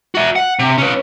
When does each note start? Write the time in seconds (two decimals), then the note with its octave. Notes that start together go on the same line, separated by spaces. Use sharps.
0.15 F#4 E5
0.36 F#5
0.59 C3
0.78 C#4 B4